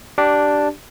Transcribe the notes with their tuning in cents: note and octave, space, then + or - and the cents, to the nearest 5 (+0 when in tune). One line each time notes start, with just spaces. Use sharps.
D4 +0 G4 -15 D5 +0